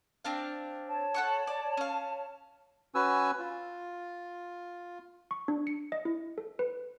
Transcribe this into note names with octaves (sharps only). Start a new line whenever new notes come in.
C4 D4 F5
C#5 A5
A4 F#5 C#6
D5
C#4 F5
C#4 F#4 B4 G#5 E6
F4
C#6
D4
C#7
D#5
E4
A4
B4